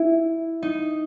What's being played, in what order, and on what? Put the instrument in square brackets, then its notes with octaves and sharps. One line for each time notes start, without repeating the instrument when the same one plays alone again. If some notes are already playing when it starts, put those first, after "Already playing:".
Already playing: [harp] E4
D#4